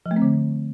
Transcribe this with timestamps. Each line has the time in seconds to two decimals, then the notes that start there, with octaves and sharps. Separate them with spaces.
0.06 F3
0.11 A3
0.16 C4
0.22 D3